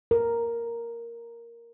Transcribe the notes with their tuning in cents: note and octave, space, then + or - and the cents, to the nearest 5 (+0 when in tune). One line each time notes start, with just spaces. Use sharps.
A#4 +0